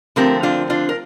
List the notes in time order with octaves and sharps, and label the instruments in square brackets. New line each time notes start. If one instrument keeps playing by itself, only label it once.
[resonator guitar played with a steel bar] D3 F3 A3 C4 G4 A#4
D4 F4
D4 F4
A#4